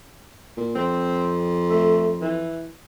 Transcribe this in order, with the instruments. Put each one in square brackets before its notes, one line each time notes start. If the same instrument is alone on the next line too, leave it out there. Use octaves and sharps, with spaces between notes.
[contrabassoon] A#2
[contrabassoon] F2 [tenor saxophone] C4
[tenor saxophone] A3
E3